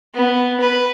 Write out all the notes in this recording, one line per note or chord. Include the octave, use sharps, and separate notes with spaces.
B3
B4